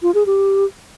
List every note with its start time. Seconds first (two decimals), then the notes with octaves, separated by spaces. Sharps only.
0.03 F4
0.14 G#4
0.26 G4